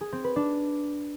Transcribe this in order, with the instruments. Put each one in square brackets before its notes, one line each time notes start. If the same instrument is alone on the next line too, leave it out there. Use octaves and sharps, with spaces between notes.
[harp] G#4
C4
B4
D4